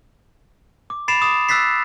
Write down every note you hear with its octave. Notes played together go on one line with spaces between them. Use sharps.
D6
B5 A6 C7 D7 E7 F7
D6 D#6 E7
E6 F#6 A6 B6 C7